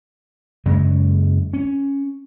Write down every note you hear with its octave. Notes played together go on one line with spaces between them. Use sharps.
F#2 C#3 F#3 G#3
C#4